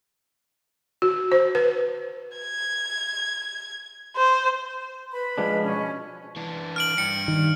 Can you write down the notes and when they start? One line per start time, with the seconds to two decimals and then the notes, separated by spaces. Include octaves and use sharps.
1.02 F#4
1.32 C5
1.55 B4
2.38 G#6
4.17 C5
5.13 B4 B5
5.38 F3 G#3 D4
5.63 B2 C#4
6.36 E3 D4
6.76 F6 D7 F#7
6.98 G2 G3 C#7
7.28 D#3